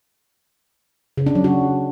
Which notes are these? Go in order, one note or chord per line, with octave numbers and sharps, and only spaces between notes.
C#3
D4
F#3
F#4